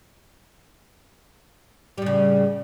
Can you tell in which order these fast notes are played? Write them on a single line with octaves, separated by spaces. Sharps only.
G3 A2 C#3